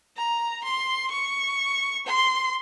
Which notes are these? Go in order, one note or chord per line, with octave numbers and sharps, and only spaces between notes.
A#5
C6
C#6
C6